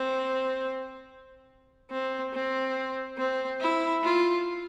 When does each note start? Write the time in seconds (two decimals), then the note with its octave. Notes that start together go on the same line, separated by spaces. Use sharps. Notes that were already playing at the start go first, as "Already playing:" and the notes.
Already playing: C4
1.91 C4
2.33 C4
3.18 C4
3.60 E4
4.03 F4